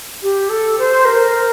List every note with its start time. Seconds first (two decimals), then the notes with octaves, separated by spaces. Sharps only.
0.22 G4
0.49 A4
0.78 C5
1.05 A#4